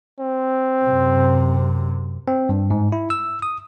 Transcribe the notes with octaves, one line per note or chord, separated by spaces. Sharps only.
C4
F#2 C3
C4
G2
G#2
E4
E6
D#6